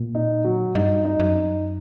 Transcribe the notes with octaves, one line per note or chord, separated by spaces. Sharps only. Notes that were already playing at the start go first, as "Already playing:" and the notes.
Already playing: A#2
D#4
F#3
G2 D#4
D#4
F#2
D#4